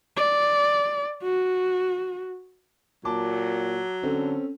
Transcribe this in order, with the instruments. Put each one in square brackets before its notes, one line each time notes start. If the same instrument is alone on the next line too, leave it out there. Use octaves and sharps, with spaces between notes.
[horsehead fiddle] D5
F#4
[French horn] A#2 [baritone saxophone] F#3 [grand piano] A5 D6
[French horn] D3 [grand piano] C4 C#4 A4